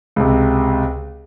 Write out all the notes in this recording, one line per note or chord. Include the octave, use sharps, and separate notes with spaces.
C#2 C3